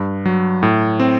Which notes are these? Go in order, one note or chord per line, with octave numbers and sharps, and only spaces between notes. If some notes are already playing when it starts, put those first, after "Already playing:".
Already playing: G2
F#3
A2
C4